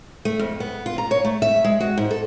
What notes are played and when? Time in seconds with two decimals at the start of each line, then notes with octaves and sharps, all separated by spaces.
0.25 A3
0.39 F2
0.60 B3
0.86 F4
0.98 A#5
1.11 C#5
1.25 A3
1.42 E5
1.64 G#3
1.80 F#4
1.98 G#2
2.11 A4